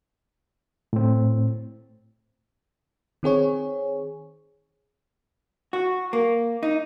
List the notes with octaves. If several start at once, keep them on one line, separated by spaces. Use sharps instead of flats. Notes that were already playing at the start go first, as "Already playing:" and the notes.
A2 C4
D#3 C4 G#4 C#5
F#4
A#3
D#4